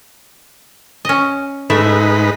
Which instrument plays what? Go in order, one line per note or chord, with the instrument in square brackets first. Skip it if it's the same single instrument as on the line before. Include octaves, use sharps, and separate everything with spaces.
[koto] C#4 D#5
[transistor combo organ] G#2 D#4 B4 [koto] A3 E4 E5